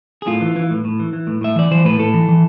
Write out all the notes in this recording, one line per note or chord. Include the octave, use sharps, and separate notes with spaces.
G#4
A2 F4
E3
E3
A2
A2
E3
E3
A2
A2 E5
E3 D5
E3 C5
A2 B4
A2 A4
E3
E3